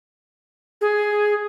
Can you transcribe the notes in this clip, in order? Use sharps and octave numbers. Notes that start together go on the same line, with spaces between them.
G#4